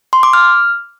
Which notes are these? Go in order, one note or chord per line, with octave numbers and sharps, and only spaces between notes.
C6
D6
F6